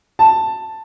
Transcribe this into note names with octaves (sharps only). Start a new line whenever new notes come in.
A5